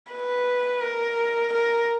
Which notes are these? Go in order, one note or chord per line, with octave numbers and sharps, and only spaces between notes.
B4
A#4
A#4